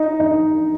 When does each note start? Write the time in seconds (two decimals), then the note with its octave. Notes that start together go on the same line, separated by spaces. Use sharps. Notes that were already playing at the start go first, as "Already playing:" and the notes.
Already playing: D#4
0.20 D#4